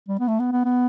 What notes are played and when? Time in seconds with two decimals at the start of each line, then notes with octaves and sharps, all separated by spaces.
0.08 G3
0.19 B3
0.28 A3
0.39 B3
0.52 B3
0.64 B3